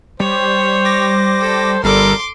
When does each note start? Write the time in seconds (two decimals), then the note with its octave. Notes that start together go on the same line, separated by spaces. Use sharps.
0.20 G3 C5 C#5
0.85 D6 A#6
1.40 A4
1.84 G1 G3 A4 A#4 C6 D6